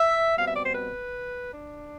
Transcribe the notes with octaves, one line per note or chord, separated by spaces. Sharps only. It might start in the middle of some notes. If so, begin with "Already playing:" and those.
Already playing: E5
B2 G3 C4 F5
E5
D5
C5
B4
D4